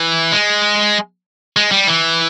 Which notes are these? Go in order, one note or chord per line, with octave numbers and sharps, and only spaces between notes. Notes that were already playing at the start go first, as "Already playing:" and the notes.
Already playing: E3
G#3
G#3
G3
E3